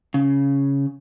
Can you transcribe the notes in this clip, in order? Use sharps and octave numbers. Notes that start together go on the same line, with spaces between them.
C#3